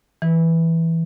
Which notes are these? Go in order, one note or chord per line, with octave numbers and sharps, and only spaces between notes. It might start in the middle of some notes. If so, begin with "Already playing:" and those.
E3